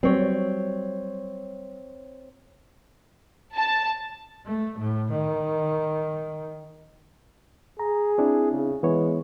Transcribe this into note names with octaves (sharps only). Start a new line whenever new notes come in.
F#3 G3 C4 C#5
A5
A3
A2
D#3
G#4 A#5
C4 D4 E4
C#3
E3 G#3 B3 C#5